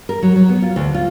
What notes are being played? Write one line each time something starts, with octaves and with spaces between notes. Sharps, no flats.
A#4
F#3
F#3
B3
F4
D2
F4